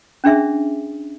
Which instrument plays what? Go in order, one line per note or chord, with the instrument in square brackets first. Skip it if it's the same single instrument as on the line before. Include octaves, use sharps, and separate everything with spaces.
[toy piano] C#4 D4 G#4 E5